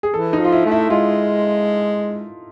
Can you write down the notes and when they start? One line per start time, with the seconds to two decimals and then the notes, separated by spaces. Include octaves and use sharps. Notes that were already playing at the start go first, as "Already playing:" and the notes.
0.03 G#4
0.14 E3 A4
0.33 D#4
0.39 F3
0.45 F4
0.52 E4
0.66 A3
0.72 E4
0.90 G#3 F4